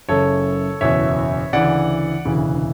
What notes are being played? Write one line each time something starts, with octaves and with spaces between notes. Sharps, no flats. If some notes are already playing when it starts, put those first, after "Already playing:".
F#1 F#2 C#3 A4 C#5
F#1 E2 B2 C#5 E5
D2 C#3 E3 D5 F#5
E1 D2 C#3 E3